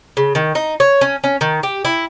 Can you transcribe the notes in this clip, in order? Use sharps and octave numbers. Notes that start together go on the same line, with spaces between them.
C#3
D#3
D#4
C#5
C#4
C#4
D#3
G4
E4